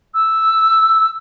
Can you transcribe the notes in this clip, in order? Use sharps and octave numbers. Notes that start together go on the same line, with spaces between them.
E6